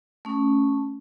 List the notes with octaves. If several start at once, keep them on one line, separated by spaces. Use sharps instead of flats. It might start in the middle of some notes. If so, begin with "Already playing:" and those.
A3 C#4